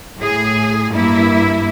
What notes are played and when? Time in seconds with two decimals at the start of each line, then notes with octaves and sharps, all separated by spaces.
0.17 A2 G#4
0.91 G2 A#3 E4